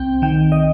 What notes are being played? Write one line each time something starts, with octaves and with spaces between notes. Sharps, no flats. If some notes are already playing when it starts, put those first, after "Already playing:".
Already playing: C2 C4 G5
D#3 G5
D#5